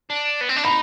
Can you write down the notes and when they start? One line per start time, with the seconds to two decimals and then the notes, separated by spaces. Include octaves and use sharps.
0.10 D4
0.41 B3
0.49 C4
0.56 D4
0.64 D#4 B5